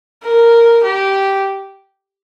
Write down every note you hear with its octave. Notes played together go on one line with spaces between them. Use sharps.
A#4
G4